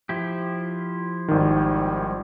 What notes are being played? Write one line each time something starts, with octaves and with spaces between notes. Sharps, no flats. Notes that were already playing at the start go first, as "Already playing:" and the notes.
F3 E4 G4
G#1 D#3 G3